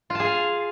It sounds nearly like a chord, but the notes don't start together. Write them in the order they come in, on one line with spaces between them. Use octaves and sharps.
F4 A5 G#4 F5